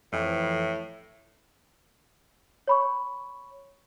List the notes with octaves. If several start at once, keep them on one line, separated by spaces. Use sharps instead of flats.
F2 A2 E3
C#5 B5 C#6